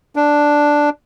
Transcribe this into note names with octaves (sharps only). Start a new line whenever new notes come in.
D4